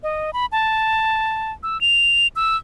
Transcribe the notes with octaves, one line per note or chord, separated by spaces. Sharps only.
D#5
B5
A5
E6
F7
E6